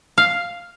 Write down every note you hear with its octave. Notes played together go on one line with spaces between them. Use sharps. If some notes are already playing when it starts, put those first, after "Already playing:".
F5